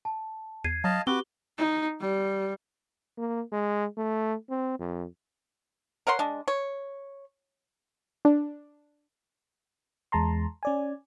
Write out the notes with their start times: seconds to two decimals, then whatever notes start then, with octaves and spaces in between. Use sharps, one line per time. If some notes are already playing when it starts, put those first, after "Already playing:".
0.05 A5
0.64 E2 G#6 C7 D#7
0.84 F#3 D#5 F5 A5
1.07 C4 F#4 G4 B4 D6 G7
1.58 D#4
2.00 G3
3.17 A#3
3.52 G#3
3.97 A3
4.50 C4
4.79 F2
6.07 A#4 C#5 F#5 C6
6.19 G#3 D4
6.48 C#5
8.25 D4
10.12 E2 G#3 A5 A#5 C6
10.63 C#4 D5 G#5